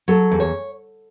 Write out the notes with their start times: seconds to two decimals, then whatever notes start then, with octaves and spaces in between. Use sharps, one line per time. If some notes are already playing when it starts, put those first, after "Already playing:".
0.08 F#3 A4
0.32 E2
0.40 C#5